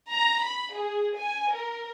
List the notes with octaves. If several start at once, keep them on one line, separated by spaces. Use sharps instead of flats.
A#5
B5
G#4
G#5
A#4